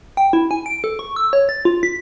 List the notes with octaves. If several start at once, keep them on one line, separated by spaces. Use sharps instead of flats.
G5
E4
G#5
D7
A4
C#6
E6
C#5
A6
F4
B6